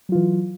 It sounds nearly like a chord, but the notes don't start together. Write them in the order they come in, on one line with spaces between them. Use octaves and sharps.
F#3 F4 E3